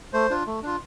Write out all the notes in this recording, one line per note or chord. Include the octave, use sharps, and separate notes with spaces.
A3 C5
D4 F4
A3
D4 F4